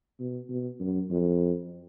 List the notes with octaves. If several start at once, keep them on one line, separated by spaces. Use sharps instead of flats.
B2
B2
F#2
F2